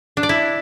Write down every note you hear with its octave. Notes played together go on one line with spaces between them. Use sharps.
D4
D5
E4